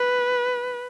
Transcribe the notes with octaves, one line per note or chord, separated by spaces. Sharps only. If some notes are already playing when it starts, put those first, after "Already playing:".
Already playing: B4